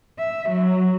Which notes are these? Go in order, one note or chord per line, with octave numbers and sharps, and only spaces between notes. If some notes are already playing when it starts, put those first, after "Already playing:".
E5
F#3